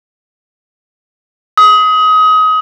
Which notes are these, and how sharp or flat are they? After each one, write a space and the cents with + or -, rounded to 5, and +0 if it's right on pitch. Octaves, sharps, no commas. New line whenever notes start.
D#6 +25